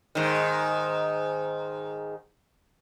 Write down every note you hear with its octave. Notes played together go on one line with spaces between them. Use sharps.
G#2 D#3